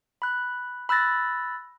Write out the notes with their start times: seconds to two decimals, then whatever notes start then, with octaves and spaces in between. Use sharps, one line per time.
0.22 B5 F#6
0.89 B5 E6 F#6 A6 A#6